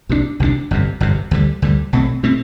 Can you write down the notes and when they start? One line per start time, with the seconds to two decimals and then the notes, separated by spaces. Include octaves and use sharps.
0.09 C2 C3 G3 D4
0.40 C2 C3 G3 D4
0.71 G1 F2 C3
1.00 G1 F2 C3
1.31 D2 D3 G3
1.62 D2 D3 G3
1.93 B1 B2 A3 C4
2.23 B2 A3 C4